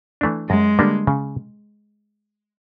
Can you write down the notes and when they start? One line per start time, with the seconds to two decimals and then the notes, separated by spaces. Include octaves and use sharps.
0.21 E3 A3 D4
0.50 F#2 G#3
0.79 D3 G3 A#3 D4
1.07 C#3